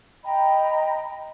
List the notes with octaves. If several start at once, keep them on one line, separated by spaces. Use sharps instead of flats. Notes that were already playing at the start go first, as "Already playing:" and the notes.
D#5 G5 A#5 B5